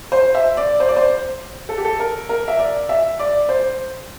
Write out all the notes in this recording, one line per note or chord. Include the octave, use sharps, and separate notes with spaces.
C5
E5
D5
C5
D5
C5
A4
G4
A4
A#4
A#4
E5
D5
E5
D5
C5